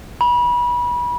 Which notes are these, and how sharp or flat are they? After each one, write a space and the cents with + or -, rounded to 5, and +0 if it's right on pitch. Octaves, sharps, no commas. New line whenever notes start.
B5 -30